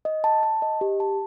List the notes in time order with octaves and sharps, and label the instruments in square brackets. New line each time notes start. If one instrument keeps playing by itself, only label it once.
[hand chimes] D#5
A5
A5
D#5
G4
A5